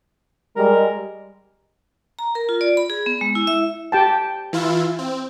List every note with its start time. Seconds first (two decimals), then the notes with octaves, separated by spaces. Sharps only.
0.56 G3 G#3 A#4
2.19 A#5
2.35 A#4
2.49 F4
2.61 D5
2.77 B5
2.90 G#4
3.06 B3
3.21 G#3
3.35 E4
3.47 E5
3.92 G4 G5 A5
4.53 E3 E4 F4
4.99 C4